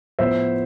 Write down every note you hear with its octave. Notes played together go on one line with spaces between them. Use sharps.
A2 F3 B3 C5 E5